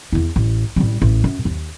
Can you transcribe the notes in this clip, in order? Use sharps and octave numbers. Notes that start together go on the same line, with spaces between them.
E2 E4
A1
A1 G3
A1
F#2
D#2